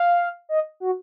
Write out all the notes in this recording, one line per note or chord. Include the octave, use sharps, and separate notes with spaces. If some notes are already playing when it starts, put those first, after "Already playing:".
Already playing: F5
D#5
F#4